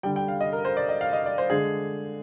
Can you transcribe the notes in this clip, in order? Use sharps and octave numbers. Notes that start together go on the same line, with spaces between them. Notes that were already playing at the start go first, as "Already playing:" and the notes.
D3 G3 G5
G5
F5
D#5
A#4
C5
D5
D#5
F5
D#5
D5
C5
D3 G#3 G#4